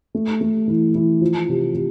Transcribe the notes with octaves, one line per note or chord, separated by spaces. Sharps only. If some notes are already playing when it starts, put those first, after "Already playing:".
A3
A3
E3
E3
F3
C3
C3